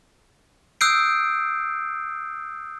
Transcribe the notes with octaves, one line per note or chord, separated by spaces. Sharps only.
D#6 E6 F#6 G6 C7 D7